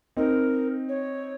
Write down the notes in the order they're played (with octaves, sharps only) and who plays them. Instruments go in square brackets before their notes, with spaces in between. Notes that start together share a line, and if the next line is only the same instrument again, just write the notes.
[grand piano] C4 D#4 [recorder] A#4
[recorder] C#5